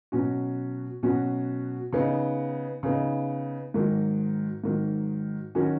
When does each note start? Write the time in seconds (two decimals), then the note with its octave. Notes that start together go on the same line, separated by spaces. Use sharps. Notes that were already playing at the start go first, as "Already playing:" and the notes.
0.12 B2 F#3 C#4 F#4
1.03 B2 F#3 C#4 F#4
1.93 C#3 B3 D#4
2.83 C#3 B3 D#4
3.74 G#2 D#3 F#3
4.64 G#2 D#3 F#3
5.55 D#3 F#3 C#4 F#4